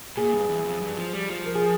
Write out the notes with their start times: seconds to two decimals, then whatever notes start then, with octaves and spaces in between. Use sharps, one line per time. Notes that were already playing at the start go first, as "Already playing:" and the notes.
0.17 A#2 G#4
0.33 G2
0.49 E2
0.65 F2
0.81 G2
0.97 F3
1.14 G3
1.30 F3
1.46 A#4
1.55 G#4